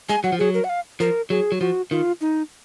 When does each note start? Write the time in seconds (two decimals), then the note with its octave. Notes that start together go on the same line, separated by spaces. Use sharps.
0.09 G#3 G#5
0.24 F#3 F#5
0.32 F3
0.39 F#3 G#4
0.54 A#4
0.64 F#5
0.69 F5
1.00 F3 A#4
1.30 F#3 G#4
1.52 F#3
1.61 F3 F#4
1.91 D#3 F4
2.21 D#4